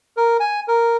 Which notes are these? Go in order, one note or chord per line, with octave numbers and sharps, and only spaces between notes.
A#4
G#5
A#4